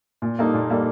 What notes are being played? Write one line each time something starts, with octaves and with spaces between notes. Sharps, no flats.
A#2
G3 A#3 D#4 A4
A#2
G3 A#3 D#4 A4